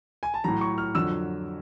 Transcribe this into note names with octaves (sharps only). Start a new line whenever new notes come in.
G#5
A5
A2 F#3 A#5
C#6
F6
F2 D3 F#3 E6